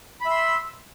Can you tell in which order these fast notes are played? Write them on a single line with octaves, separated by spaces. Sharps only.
B5 E5 C6 E6